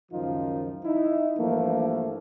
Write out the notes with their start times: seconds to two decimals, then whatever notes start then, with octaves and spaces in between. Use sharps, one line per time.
0.11 C#2 F#2 D#3 F3 D#4 F4
0.84 D#4 E4
1.38 G2 E3 F3 A3 A#3